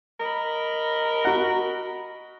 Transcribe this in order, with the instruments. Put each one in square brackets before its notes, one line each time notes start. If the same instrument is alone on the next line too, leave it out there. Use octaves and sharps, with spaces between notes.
[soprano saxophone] A#4 [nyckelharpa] D#5 B5
[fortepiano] F#4 F#5